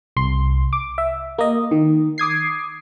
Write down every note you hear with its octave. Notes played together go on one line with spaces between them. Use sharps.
C2 C6
D6
E5
A#3 D#5
D#3
D6 D#6 G#6 C7